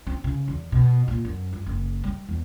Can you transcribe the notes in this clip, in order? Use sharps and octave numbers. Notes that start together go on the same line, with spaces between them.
C4
C#3
E2
B2
A#2
F#2
G2
F#1
G3
E2